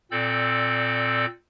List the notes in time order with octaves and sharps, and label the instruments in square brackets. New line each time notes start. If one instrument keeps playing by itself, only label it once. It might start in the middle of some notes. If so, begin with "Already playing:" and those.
[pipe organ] A#2 C4 A4 D5 E6 G6